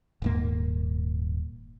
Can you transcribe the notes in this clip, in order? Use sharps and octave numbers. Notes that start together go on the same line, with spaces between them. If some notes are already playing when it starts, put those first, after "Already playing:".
D#1 G#2 A#3